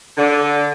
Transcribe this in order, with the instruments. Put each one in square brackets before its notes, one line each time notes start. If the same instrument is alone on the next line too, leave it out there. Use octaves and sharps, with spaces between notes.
[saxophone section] D3